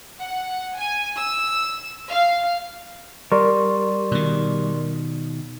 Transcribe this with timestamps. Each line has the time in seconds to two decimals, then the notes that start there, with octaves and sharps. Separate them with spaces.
0.20 F#5
0.79 G#5
1.17 E6
2.10 F5
3.32 G3 A#4 D5 C6 C#6
4.11 B2 D#3